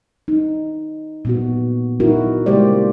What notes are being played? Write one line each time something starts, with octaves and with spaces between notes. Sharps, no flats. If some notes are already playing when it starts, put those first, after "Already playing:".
D#4
A#2 B3 F#4
D#4 E4 F#4 A#4
C#3 G#3 A#3 G4 C5 D5